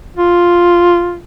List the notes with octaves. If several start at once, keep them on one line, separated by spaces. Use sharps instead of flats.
F4